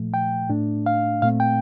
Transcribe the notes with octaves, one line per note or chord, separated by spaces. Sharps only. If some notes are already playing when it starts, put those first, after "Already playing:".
Already playing: A#2 F3 A3
G5
A2 A3 D4
F5
A#2 A3 C4 F5
G5